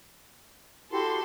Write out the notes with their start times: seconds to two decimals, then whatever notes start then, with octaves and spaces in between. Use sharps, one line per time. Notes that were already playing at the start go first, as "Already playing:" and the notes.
0.91 E4 F#4 G4 A4 C6